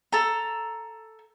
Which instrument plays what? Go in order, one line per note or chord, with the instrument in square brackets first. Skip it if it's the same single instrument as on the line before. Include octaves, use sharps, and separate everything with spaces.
[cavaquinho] A4 A#5